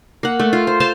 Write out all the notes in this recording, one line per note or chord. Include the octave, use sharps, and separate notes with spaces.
A#3 F#5
A3
F4
C5
C5 F5 A5